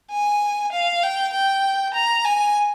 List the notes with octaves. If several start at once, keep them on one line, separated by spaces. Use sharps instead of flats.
G#5
F5
G5
G5
A#5
G#5